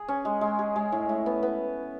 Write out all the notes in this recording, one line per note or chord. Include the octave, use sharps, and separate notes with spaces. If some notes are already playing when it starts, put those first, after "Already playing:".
Already playing: G#4
C#4
G#3
G#3
G#4
G#3
A2
A2
B3
B3